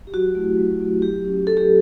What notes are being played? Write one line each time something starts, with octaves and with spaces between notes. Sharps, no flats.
G4
F#3 F#4
A3 E4
F#3
A3 E4
F#3 G4
C#4 F#4
F#3 A4
G4